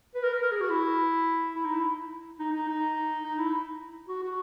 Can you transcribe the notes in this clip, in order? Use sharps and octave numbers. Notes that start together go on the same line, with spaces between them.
B4
A#4
B4
A#4
G#4
F#4
E4
E4
D#4
E4
D#4
D#4
D#4
D#4
E4
F#4
F#4